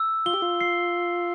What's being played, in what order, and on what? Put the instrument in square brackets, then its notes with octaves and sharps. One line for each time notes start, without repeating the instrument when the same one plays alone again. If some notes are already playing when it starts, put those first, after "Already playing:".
Already playing: [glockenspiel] E6
[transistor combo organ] F4 [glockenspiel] G7
[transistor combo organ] G4
F4
[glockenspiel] C7